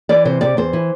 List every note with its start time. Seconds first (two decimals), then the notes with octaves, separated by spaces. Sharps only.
0.09 E3 D5
0.25 C3 C5
0.41 C3 D5
0.57 E2 C5
0.73 E3